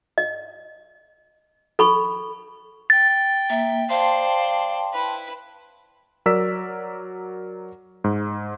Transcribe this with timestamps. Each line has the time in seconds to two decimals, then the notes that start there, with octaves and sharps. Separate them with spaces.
0.18 D#5
1.79 A4 B5 C#6
2.90 G5 A6
3.50 A#3 E5
3.89 C5 D5 F5 G5 A5 C6
4.93 E4 B4
6.26 F#3 A#4 D5 E6 B6
8.04 G#2